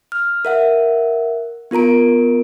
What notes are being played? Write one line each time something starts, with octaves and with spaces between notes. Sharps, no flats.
F6
A#4 E5 F#5
B3 F4 A#4 A#5 D7